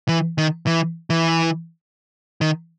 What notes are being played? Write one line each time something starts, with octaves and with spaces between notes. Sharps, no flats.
E3
D#3
E3
E3
D#3